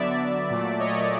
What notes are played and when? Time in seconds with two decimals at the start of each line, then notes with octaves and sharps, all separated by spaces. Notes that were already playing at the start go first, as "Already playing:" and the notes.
Already playing: D3 F#3 B3 D5 E5
0.50 A#2 F#3 A3
0.79 C#5 D#5